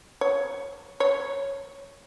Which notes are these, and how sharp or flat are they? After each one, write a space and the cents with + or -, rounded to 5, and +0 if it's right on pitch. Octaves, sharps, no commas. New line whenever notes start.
C#5 +0
C#5 -5